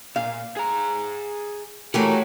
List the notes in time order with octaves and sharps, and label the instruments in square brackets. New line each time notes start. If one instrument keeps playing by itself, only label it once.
[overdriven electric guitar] A#2 [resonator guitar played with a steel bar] F5
[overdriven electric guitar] G#4 A#5
[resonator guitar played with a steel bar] E3 A#4 [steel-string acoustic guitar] A3 F#4 G4 [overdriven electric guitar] C#5 F#5